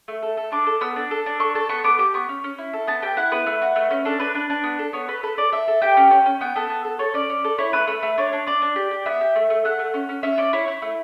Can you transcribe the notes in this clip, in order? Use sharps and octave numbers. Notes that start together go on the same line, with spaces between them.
A3
A4
A4
D4 D6
A4
B3 E6
D4
A4
D4
A4 C#6
A4 A5
B3 C#6
B3 D6
G4 D6
B3 C#6
C#4
C#4
E4
A4
B3 A5
G4 G5
E4 F#5
B3 B4
A3
F#4
A3
C#4
D4 A4
D4 B4
D4 B4
D4
B3
A4
B3 C#5
A4 B4
A4 B4
A4 D5
A4 E5
A4
G4 G5
C#4
C#4
C#4
B3 G5
B3 A4
B3
A4
A4 C#5
C#4 D5
C#4
A4
E4 C#5
A3 B4
A3 B4
A3
D4 C#5
D4
D4 D5
D4
G4
G4
B3 E5
G4
A3
A3
A3 F#5
A3
C#4
C#4
C#4 E5
C#4 D5
E4 C#5
E4
A3